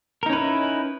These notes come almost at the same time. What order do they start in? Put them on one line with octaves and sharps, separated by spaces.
A#4 D#4 C#4 B4 E4